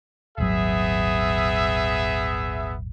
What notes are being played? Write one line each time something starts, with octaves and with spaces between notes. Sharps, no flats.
D#1 G#1 F#3 B3 G#4 E5